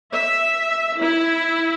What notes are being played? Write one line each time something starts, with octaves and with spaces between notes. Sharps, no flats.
E5
E4